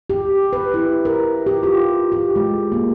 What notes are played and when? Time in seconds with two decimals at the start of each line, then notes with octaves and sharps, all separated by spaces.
0.10 G4
0.53 B4
0.74 E4
1.05 A#4
1.47 G4
1.63 F4
2.12 G4
2.36 G#3
2.72 A#3